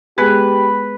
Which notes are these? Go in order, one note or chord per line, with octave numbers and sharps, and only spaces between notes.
G#3 B3 G4 G#4 B4